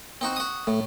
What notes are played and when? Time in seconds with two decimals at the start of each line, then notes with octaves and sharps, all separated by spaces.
0.21 C4 D#4 F#4
0.36 F#4 D#6
0.67 A2 A3